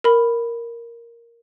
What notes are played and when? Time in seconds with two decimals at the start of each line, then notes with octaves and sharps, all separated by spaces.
0.04 A#4 B5